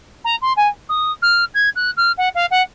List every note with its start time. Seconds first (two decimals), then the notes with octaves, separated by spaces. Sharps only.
0.25 A#5
0.42 C6
0.57 G#5
0.89 D#6
1.22 F6
1.54 G#6
1.76 F#6
1.97 F6
2.18 F#5
2.35 F5
2.51 F#5